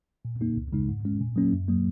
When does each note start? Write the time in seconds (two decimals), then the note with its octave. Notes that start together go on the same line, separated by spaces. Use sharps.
0.25 A#2
0.41 A#3 D#4
0.57 C#2
0.73 C#3 G#3 D#4
0.88 G#2
1.05 G#3 C#4
1.21 A#2
1.36 F#3 A#3 C#4
1.53 F#2
1.68 F#3 A#3